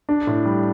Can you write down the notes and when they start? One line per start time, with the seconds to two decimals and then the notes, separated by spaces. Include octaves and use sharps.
0.09 D4
0.27 A2
0.45 G3